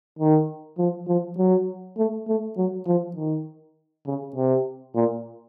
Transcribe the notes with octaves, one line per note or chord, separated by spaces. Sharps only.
D#3
F3
F3
F#3
A3
A3
F#3
F3
D#3
C#3
C3
A#2